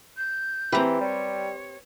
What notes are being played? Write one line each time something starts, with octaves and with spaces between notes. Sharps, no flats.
G6
E3 C4 G4 B4 A#5
G3 C#5